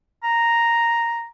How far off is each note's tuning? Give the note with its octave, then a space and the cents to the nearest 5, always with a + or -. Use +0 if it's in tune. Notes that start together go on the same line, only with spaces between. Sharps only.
A#5 +0